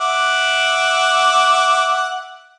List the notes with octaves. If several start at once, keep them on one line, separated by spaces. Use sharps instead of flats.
E5 F#5 D6